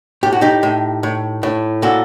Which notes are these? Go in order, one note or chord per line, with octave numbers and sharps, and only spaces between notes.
A2 G4
F#4
D#4 G4
A2
A2
A2
A#2 F#4 A4